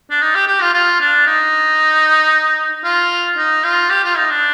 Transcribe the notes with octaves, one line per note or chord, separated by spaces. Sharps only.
D4
D#4
G4
G4
F4
F4
D4
D#4
F4
D#4
F4
G4
F4
D#4
D4